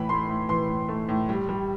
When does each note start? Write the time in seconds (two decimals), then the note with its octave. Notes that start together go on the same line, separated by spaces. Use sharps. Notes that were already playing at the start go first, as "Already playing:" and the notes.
Already playing: A2 E3 B5
0.09 A3 C6
0.29 A2
0.49 E3 C6
0.68 A2
0.89 A3
1.09 A2
1.29 G3
1.49 G3